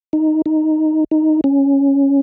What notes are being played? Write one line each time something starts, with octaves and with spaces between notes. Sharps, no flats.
D#4
D#4
D#4
C#4